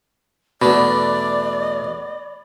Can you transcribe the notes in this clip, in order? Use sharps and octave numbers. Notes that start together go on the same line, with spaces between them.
E2 B2 A3 D4 D5 B5